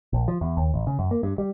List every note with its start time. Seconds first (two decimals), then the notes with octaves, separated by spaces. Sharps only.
0.13 A#1
0.28 F3
0.41 E2
0.57 D#2
0.74 A1
0.87 C#3
0.99 F#2
1.11 A#3
1.23 G2
1.38 G3